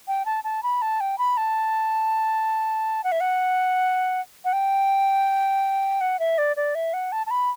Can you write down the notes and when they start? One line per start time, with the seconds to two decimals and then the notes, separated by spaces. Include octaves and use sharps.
0.08 G5
0.26 A5
0.44 A5
0.63 B5
0.82 A5
1.00 G5
1.18 B5
1.37 A5
3.04 F#5
3.12 E5
3.20 F#5
4.45 F#5
4.53 G5
6.01 F#5
6.19 E5
6.38 D5
6.57 D5
6.75 E5
6.93 F#5
7.12 A5
7.27 A5
7.31 B5